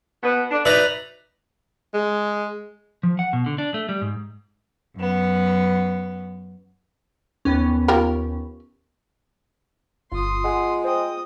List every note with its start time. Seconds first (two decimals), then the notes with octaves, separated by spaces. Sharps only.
0.23 B2 B3
0.51 D4
0.65 F#3 D#4 B4 D5 E5 A#5
1.94 G#3
3.03 F3
3.19 F#5
3.33 B2
3.46 D3
3.58 D4
3.74 A3
3.89 G3
4.02 G#2
4.97 F#2 B3
7.45 D#2 B3 C#4
7.88 F4 G4 A#4
10.12 G1 F4 C6 D#6
10.44 G#3 F#5 G#5
10.84 C5 D#5 G5 D#6